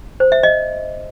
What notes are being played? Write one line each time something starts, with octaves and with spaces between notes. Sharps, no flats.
C5
E5
D#5